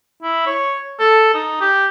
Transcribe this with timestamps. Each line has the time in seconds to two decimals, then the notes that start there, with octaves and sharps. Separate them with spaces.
0.22 E4
0.46 C#5
0.99 A4
1.34 D#4
1.61 G4